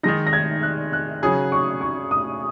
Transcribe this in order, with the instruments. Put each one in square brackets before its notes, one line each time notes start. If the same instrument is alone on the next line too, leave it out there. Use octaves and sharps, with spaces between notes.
[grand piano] D#3 G#3 D#4 [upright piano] A#6
[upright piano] A#6
G#6
F#6
F#6
[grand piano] C#3 F#3 C#4 G#4 [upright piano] D#6
[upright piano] C#6
C#6
D#6